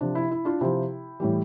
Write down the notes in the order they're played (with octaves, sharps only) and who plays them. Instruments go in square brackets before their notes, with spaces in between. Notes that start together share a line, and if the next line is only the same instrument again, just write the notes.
[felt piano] C3 F3 D4
E4
E4
D4 F4
C3 F3 E4 G4
A2 E3 G3